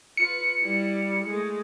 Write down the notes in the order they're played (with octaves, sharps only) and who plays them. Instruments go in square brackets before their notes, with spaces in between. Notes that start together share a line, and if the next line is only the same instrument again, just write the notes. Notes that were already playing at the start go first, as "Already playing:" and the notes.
[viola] F4 B4 [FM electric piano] C#7
[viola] G3 E4
G#3 A3